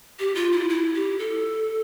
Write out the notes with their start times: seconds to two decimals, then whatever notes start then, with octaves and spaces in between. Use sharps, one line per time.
0.19 G4
0.35 F4
0.52 E4
0.69 E4
0.95 G4
1.19 A4